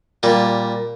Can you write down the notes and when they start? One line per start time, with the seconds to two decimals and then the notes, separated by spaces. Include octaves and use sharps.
0.23 A#2 G3